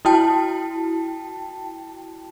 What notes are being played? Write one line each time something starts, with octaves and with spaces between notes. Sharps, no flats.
E4 F#4 G5 A5